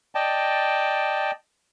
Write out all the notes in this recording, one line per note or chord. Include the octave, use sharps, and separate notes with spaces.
D5 D#5 G5 A5